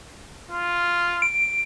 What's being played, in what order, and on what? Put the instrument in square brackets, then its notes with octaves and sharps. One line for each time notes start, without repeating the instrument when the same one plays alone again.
[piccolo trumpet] F4
[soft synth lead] D7